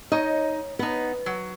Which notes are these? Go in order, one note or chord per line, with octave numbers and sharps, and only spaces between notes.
D#4 C#5 D#5
B3 D#4 B4
F#3